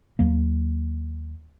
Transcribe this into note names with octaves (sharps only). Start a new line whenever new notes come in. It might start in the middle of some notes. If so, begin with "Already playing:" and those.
D#2 F#3 A#3